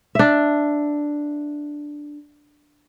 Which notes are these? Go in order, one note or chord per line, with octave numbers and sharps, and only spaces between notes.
D4 E5